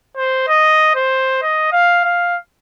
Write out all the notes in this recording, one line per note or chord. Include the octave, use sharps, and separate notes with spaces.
C5
D#5
C5
D#5
F5
F5